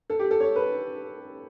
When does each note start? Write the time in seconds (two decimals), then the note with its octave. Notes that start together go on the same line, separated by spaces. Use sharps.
0.10 A4
0.19 G4
0.31 A4
0.40 C#5
0.56 B4